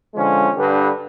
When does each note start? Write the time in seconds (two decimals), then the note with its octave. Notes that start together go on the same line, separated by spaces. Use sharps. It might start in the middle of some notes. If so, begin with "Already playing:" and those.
0.15 D3 F3 G#3 C#4
0.56 G2 D3 G4 B4